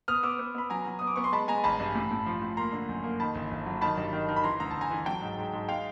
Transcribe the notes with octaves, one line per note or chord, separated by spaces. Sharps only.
B3 D#6 F6
B3 D6 E6
B3
B3 B5
F#3 G#5 A#5
F#3
B3 D#6
D6
B3 C#6
C6
G#3 A5 B5
G#3 G#5 A#5
A1 A5 B5
G2
A2
A2
F3
A2
A#3 A#5 C6
D3
F#2
A#3
D#3 A5 B5
G1
G1
F#3
D#3 A5 B5
G2
D#3
D#3
B5
E3 A#5 C6
D2 A#5
D2 A5
G#5 A#5
E3
F#3 G5 A5
G#2
G#2
G#2
G#3 F5 G5